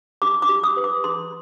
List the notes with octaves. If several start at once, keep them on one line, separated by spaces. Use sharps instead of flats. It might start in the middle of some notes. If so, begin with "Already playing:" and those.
G4 D6
D6
G4
D#6
B4
D6
G#4 C6